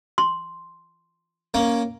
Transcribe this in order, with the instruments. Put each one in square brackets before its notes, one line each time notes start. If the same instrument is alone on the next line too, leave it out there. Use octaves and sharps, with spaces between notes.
[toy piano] C6
[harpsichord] A#3 C#4 D6